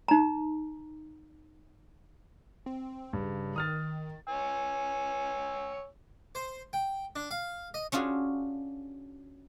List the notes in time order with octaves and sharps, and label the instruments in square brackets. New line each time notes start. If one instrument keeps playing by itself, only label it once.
[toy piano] D#4 A#5
[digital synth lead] C4
[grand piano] G2 [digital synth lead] C#3
[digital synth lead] D#3 [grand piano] D#6 F6 A6
[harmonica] C#5 G#5 E6
[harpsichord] C5
G5
D4
F5
D#5
[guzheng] C#4 D4 F4 F#4 G#4